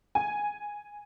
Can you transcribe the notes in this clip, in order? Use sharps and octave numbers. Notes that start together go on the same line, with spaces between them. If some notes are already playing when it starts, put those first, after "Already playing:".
G#5